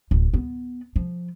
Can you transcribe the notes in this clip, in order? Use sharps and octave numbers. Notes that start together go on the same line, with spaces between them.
D1
B3
F3